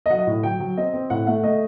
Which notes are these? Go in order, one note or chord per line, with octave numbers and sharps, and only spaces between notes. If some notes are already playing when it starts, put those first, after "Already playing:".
D#5
F#3 F#5
D#5
A2
F#3 G5
F#3
C4 D#5
C4
A2 F#5
A3 F#5
A3 D#5